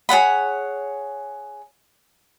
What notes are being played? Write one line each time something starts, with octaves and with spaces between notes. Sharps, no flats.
G#4 C#5 F#5 B5